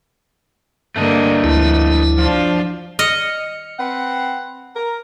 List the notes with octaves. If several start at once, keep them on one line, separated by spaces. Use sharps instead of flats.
G2 D3 A3 A#3 D4 D#5
D2 F3 E4 F4
F3 D4 F4
D#5 F6 C#7
C4 B4 F#5
A#4